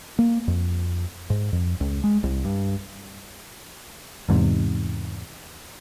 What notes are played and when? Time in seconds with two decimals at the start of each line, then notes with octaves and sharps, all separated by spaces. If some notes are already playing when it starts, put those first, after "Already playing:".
0.19 A#3
0.48 F2
1.30 G#2
1.53 F2
1.80 C#2
2.04 G#3
2.23 C2
2.45 G2
4.29 E2 G#2 C3